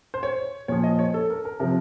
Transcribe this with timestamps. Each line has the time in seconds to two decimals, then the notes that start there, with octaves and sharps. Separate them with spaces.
0.14 C5
0.23 C#5
0.68 A#2 F3 C#5
0.84 D#5
0.99 C#5
1.14 A4
1.30 A#4
1.45 A#4
1.60 C3 F3 A#4